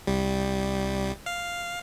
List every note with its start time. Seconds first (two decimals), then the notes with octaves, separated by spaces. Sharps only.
0.07 C2 G3
1.26 F5